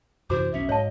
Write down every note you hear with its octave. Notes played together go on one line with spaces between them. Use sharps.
F#2 C3 E3 F#4 C5 D6
F1 B1 C#4 E5
G#2 C#5 D#5 F5 A5